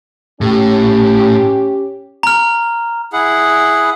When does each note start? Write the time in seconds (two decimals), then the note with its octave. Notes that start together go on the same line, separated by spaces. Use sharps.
0.41 A2 C#4 G4
2.23 A#5 F6
3.13 E4 G#4 F#5